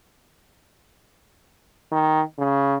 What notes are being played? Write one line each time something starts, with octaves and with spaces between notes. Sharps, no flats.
D#3
C#3